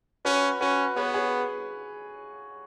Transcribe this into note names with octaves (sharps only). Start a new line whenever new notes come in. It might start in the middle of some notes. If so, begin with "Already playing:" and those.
C#4 F#4 B4
C#4 F#4 B4
B3 G#4 C#5
G#4 C#5